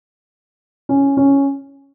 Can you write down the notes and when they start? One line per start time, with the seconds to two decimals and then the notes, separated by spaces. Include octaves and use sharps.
0.89 C#4
1.17 C#4